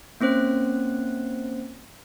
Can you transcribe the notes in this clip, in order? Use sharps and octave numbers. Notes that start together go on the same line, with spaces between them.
A#3 C4 C#4 C5 F#6